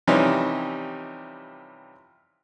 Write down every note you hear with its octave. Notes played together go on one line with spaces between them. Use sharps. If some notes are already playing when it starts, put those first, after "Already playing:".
C3 E3 F3 G3 C#4 D#4